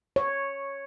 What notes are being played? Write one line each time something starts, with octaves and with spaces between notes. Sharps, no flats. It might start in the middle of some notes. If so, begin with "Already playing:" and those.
C#5